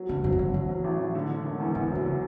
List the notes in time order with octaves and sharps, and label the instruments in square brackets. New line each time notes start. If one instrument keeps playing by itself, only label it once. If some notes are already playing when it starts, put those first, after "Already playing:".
Already playing: [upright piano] F#3
[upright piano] G2 [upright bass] C#3
[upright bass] F#2 [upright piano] F#3
[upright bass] C#3
[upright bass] D3 [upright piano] F#3
[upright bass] E3 [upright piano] F#3
[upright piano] F#3
A1
A1
D3
D3
E1
E2
[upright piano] E2 [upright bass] D3
[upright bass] C#3 [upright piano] F#3
[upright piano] F#3